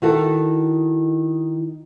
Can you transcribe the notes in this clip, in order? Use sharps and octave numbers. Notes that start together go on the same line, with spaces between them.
D#3 E4 F#4 A4